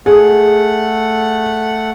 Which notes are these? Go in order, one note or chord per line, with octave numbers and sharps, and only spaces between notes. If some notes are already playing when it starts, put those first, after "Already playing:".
A3 G#4 F#5